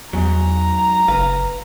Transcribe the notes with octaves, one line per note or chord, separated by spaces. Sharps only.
E2 G#2 F#3 A#5
F#1 B4 F5